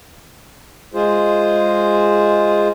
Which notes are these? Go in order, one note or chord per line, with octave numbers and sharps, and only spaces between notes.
G#3 F4 G#4 C5